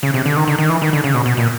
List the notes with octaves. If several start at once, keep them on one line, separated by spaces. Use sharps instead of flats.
C#3
C3
D3
D#3
D3
D#3
E3
D#3
D3
C#3
B2
B2
A#2